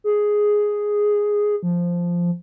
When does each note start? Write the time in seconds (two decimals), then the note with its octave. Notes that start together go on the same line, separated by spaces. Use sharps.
0.04 G#4
1.63 F3